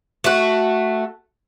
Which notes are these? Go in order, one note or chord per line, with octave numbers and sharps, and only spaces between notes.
A3 F#4